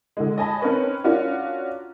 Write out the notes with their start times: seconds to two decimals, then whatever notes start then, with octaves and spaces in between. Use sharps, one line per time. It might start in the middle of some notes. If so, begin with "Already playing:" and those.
0.17 D3 G#3
0.37 C#5 D#5 G#5 A5 B5
0.62 C4 C#4 D#4 A#4 B4 C#5
1.04 C#4 D4 F4 F#4 A#4